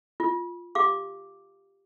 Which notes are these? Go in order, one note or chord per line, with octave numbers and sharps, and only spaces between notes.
F4
G4 F5 D6